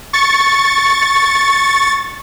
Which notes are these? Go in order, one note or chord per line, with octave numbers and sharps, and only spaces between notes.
C#6 A6